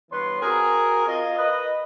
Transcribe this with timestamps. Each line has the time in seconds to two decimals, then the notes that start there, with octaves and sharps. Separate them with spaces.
0.10 G2 E3 B3 B4 C#5 C6
0.41 C4 F#4 G#4 A#4
1.07 F4 D#5
1.36 A#4 B4 D#5